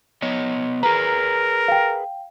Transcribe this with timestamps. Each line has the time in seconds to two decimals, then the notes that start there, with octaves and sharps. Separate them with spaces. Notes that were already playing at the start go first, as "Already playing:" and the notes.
0.22 B3 C#5 D#5
0.83 G#4 A#4 B4 A#5
1.68 F5 G5